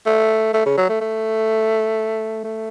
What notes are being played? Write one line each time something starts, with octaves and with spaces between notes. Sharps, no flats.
A3
A3
C#3
F#3
A3
A3
A3